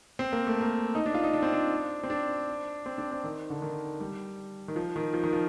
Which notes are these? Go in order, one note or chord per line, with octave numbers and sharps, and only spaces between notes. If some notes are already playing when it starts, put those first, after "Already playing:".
C4
A#3
A3
A#3
D#4
D4
F4
D#4
D4
C4
D4
C4
D4
C4
D4
C4
D#3
D3
D#3
G3
D#3
F3
D#3
F3
D#3
F3